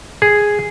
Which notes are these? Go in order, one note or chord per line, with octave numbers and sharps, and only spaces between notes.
G#4